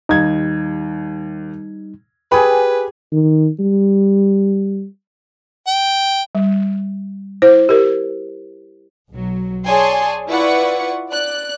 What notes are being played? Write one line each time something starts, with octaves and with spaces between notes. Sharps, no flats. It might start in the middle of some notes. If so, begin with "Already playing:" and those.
D#2 G3 D#4 G#6
G4 G#4 B4 G#5 B5
D#3
G3
G5
G3
E4 C5
G4 A#4
B1 F#3
G#4 C#5 D5 G#5 A5 C6
E4 F4 B4 D5 F#5 C#6
D5 F#6